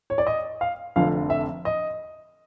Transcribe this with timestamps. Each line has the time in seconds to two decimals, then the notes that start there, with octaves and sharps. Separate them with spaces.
0.10 C#5
0.18 D5
0.27 D#5
0.61 F5
0.96 F1 F2 D3 F5
1.30 E5
1.65 D#5